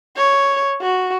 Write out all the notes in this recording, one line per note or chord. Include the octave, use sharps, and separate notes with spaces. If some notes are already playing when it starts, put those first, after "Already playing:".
C#5
F#4